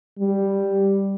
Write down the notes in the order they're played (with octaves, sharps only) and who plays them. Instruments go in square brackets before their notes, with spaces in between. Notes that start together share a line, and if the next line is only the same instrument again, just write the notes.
[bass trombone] G3